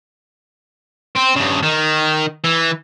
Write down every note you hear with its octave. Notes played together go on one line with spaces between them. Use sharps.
C4
G2 C#3
D#3
E3